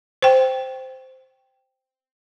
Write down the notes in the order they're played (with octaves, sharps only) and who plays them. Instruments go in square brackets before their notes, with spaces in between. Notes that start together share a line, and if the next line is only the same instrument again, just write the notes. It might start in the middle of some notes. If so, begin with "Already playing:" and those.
[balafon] C5 G5